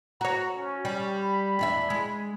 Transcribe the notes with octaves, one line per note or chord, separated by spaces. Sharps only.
F#4 C#5 A#5
C#4
G3
B5
E2 D4 E5
G#3